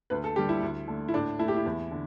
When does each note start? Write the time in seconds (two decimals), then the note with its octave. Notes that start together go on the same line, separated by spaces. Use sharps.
0.10 D2 B4
0.24 A4
0.36 D3 G4
0.39 G3
0.49 E4
0.63 D2
0.88 D3 A3
1.08 E4
1.14 A2 D4
1.39 A3 E4
1.48 G4
1.56 E4
1.66 E2
1.91 D3